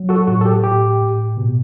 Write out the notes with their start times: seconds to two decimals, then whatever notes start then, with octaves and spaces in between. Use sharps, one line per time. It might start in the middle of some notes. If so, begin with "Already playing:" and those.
Already playing: F#3
0.09 F#4 A4
0.27 A2 F#4
0.41 A4
0.45 G4
0.63 A2 G4
1.01 A2
1.37 B2